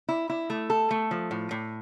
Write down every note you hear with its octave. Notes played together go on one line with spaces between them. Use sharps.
E4
E4
A3
A4
A3
F3
A2
A2